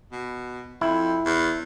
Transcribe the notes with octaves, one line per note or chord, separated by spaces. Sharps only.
B2
F2 E4
E2